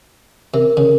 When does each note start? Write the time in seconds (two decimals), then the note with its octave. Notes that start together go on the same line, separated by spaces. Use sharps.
0.54 C3 A#4
0.77 C#3